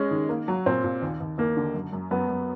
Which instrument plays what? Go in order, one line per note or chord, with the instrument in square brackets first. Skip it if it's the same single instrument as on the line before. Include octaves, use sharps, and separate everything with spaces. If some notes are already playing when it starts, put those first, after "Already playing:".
Already playing: [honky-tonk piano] G#3 [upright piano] C#4
[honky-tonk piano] D#3
A#3
F#3
[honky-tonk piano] A#2 [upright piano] C4
[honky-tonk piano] A#2
D#2
D#2
[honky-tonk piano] D#2 [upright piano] A#3
[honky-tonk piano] D3
F#2
F#2
[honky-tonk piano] F#2 [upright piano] B3
[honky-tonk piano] F#2